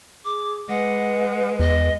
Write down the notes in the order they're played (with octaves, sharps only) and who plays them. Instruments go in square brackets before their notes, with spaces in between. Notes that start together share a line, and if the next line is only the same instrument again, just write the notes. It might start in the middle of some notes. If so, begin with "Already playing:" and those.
[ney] G#4 [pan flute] D6
[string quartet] G#3 [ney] B4 [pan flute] F#5
[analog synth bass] E2 [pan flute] D#5